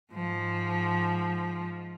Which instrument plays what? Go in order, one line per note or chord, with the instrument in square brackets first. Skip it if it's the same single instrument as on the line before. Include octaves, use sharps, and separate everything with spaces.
[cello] G#2 F3